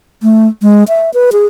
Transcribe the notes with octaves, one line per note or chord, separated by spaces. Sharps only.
A3
G#3
E5
B4
G#4